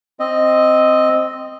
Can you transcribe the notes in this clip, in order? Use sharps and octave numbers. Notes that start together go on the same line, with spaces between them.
C4 D#5